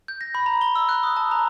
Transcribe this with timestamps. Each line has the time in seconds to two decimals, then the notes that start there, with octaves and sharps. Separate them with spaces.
0.08 G6
0.21 A#6
0.35 B5
0.46 A#5
0.61 G7
0.76 E6
0.89 F#6
1.03 D#6
1.17 A5
1.31 A#5